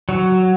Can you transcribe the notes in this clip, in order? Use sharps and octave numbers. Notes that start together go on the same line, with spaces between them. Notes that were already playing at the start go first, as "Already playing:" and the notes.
F#3